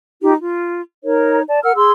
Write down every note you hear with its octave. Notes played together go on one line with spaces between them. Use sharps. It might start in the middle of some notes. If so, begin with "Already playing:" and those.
D#4 F4 G4
F4
D#4 A#4 C#5
D5 A5
A#4 F#5 E6 F6
G#4 C6 E6